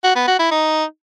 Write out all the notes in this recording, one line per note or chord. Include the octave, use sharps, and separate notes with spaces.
F#4
B3
F#4
E4
D#4